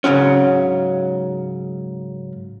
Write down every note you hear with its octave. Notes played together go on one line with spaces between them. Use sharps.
G#2 C#3 F#3 C#4